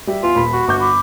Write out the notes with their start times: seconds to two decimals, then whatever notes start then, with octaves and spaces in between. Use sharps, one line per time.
0.07 G3 G4 E5
0.23 E2 F4
0.35 D#1 B5
0.53 F#4
0.68 G1 C#6 D6 G6
0.80 B5 D6